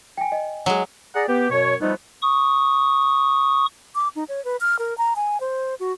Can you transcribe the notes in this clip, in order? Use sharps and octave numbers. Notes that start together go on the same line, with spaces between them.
G5 G#5
D#5
F#3 G#3
G#4 D5 F#5 A#5
B3 G4
F#2 B2 C#5
F3 G3 A3 B3 D#4
C#6 D#6
D6
D#4
C#5
B4
F6
A#4
A#5
G#5
C5
F#4